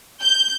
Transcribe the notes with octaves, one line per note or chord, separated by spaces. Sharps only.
G6